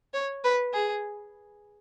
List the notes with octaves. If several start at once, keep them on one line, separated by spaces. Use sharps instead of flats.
C#5
B4
G#4